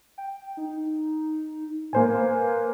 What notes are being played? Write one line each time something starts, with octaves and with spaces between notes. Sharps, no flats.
G5
D#4
A2 A#3 C5 G#5
B4